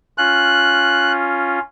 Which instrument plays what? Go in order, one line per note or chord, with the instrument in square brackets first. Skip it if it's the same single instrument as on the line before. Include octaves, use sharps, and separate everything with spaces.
[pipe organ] C#4 F4 [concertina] F#6